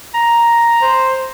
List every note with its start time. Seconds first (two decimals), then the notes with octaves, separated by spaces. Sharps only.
0.14 A#5
0.82 C5